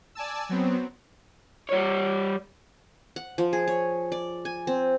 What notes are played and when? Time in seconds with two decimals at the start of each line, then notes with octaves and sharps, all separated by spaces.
0.15 D5 G#5 A5 E6
0.49 F#3 B3 C4
1.69 G3 C#5
3.16 F#5
3.38 F3
3.53 G#4
3.68 C#5
4.12 D5
4.45 G#5
4.67 C4